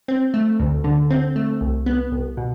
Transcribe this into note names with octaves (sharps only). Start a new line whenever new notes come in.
C4
A3
D2
D3
C4
A3
C2
B3
C2
B2